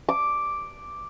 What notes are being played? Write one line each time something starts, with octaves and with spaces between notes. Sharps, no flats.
D6